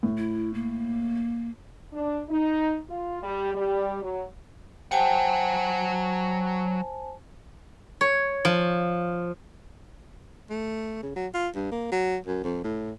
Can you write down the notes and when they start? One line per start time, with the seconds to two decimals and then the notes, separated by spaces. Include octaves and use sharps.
0.03 A2
0.17 E4
0.54 A#3
1.93 D4
2.29 D#4
2.89 F4
3.23 G3
3.55 G3
4.03 F#3
4.91 F#3 G4 C5 F#5 G#5 A5
8.01 C#5
8.45 F3
10.50 A3
11.03 C#3
11.16 F#3
11.34 F4
11.55 G2
11.72 A#3
11.92 F#3
12.27 F#2
12.44 F2
12.64 A2